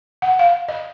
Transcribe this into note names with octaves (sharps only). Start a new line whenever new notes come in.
F#5
F5
D#5